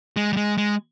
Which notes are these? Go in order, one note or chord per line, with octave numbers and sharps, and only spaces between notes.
G#3
G3
G#3
G#3